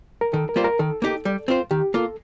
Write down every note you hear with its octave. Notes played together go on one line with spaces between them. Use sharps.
A#4
D#3 A4
A#4
G3 A#3 F4 C5
A#4
D#3 A4
A#3 D#4 G4
G3
C4 F4 C5
D#3 G4
A#3 F4 A4